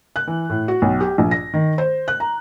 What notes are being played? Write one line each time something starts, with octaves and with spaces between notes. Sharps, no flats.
F#6
E3
A2
F#4
B1
G4
A#1
A#6
D#3
C5
F#6
A#5